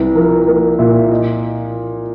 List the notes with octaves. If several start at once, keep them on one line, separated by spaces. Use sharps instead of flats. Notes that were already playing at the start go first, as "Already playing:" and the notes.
Already playing: C2 B4
F3 A#4
A#3 A#4
A#2 E5
D#5